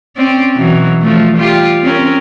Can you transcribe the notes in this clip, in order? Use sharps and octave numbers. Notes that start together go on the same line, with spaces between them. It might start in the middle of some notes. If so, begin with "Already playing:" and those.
C4 C#4 D5
B2 E3 F#3
F3 A3
G3 F4 G4
C4 C#4 A#4